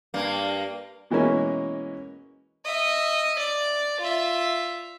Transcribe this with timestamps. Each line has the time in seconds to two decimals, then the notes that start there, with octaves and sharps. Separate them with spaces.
0.14 G2 A#3
1.10 B2 E3 G#3 A#3 C#4
2.64 D#5 E5
3.38 D5
4.00 F4 E5